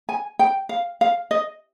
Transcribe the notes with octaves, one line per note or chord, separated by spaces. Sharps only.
G#5
G5
F5
F5
D#5